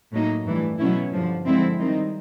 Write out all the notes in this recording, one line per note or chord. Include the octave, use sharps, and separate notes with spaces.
A2 F#3 A#3 D#4
G2 E3 A3
B2 F#3 A3 C#4 E4
G2 D3 F3
D3 F3 G#3 C4 E4
D#3 G3 C4 D#4